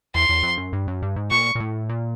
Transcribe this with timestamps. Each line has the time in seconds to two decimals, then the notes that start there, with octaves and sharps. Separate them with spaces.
0.15 E2 C6
0.29 E2
0.43 F2
0.58 F#2
0.73 G2
0.87 F#2
1.02 G2
1.16 G#2
1.30 A#2 C#6
1.55 A#2
1.60 A2
1.89 A#2